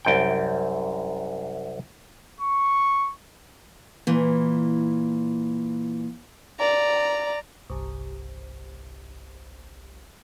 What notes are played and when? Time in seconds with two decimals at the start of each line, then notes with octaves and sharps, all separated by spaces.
0.05 C2 F#2 G5
2.41 C#6
4.07 A#2 E3
6.60 D5 A#5
7.70 G1 C2